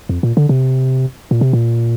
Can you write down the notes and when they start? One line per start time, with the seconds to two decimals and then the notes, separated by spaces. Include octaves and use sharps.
0.09 F2
0.23 A#2
0.37 D3
0.49 C3
1.31 A#2
1.41 C3
1.53 A#2